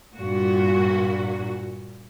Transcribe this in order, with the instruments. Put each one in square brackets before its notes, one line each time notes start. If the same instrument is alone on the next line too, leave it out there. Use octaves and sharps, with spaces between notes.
[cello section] G2 A#2 F#4